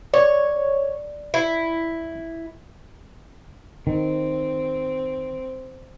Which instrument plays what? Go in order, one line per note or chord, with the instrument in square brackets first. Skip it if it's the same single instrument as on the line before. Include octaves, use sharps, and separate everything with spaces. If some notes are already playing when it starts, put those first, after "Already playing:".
[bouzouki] C#5 [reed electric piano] D5
[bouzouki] E4
[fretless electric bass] D#3 [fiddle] C4